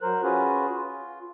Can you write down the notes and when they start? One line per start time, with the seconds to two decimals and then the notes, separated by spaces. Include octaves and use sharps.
0.01 F#3 A#4 C5 F#6
0.23 C#4 F4 F#4 G#4 B4
0.74 F4